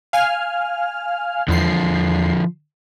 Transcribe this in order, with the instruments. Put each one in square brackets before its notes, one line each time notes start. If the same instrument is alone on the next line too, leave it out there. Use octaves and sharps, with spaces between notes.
[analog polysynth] F5 G#5 F6
[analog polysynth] E2 C7 [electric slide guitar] D3 F3